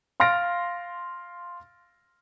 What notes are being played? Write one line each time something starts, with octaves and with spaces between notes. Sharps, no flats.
F5 C6 F6 A6 A#6 D7